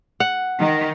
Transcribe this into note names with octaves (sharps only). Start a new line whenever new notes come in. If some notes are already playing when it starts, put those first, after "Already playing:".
F#5
D#3